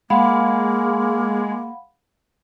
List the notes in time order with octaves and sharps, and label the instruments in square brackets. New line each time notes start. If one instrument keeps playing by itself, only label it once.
[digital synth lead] G#3 [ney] A#3 [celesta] F5 F#5 B5